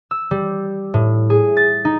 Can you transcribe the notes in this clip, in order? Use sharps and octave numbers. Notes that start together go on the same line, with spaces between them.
E6
G3
A2
G#4
A6
D#4